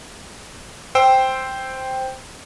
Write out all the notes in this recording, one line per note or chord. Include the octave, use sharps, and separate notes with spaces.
C5 G5 E6